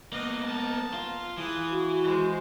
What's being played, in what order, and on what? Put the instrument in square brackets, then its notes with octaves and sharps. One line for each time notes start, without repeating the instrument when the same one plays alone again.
[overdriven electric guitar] A#3 B3 [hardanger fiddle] D#5
[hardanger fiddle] A5 A#5
[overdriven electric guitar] F4
[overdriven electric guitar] E3 [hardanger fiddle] G#4 D#6
[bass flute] F#4
[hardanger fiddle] G#3 C5